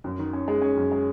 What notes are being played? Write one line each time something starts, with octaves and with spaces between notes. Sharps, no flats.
F#2
D#3
C#4
G#3
C#4
F#2
G#3